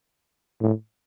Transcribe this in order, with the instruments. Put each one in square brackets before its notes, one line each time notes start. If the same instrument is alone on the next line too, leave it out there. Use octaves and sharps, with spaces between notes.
[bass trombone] A2